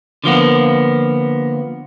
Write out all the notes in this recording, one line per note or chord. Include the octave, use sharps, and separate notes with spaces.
D3 F3 A#3 B3